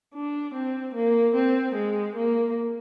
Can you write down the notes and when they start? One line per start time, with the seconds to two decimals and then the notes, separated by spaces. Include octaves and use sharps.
0.14 D4
0.54 C4
0.95 A#3
1.35 C4
1.75 G#3
2.16 A#3